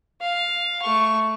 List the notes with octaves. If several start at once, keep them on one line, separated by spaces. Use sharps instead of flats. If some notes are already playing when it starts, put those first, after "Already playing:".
F5
A3 C#6